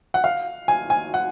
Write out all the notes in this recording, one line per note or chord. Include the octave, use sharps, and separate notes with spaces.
F#5
F5
G#5
G#5
F#5